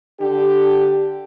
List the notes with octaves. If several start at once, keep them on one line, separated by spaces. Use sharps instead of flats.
D3 D4 G4